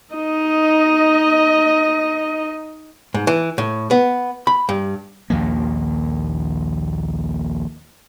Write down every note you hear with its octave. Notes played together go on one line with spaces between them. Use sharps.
D#4 D#5
G#2
E3
A2
B3
B5
G2
A#1 D#2 F3 A#3